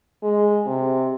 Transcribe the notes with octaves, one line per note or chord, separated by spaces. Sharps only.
G#3
C3